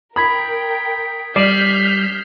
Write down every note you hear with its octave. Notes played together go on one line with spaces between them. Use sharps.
A#4 G5 B5 D#6 G#6 B6
G3 D5 F6 G6 B6 C7 E7 F#7